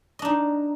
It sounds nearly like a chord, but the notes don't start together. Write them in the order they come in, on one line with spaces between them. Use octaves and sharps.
D#5 D4 D#4